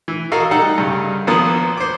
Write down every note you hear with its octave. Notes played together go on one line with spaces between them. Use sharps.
E3
F#4 A4 A#4 D#5 F5
G3 D#4 A4 F#5
G2 C#3
G#1 F3 A#3 B3 D#6
C5 D6